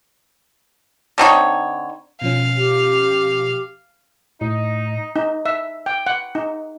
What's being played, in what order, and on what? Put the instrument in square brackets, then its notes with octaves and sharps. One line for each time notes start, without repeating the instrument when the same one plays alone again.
[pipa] D3 C4 D#4 C#5
[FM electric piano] B2 F3 C#4 [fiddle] F5
[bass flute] G4
[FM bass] A2 [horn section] D#4
[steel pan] D#4
E5
G5
F#5
D#4